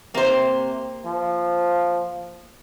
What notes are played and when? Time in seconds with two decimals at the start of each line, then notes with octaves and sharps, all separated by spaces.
0.14 C3 A#3 C5
1.06 F3